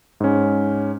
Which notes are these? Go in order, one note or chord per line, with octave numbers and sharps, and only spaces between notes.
G#2 C#4